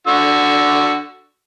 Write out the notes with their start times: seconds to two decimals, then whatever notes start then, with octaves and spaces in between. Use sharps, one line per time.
0.07 D3 F#4 E6